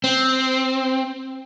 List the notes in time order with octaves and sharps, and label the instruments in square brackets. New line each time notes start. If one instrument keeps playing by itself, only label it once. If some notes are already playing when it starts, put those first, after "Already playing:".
[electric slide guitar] C4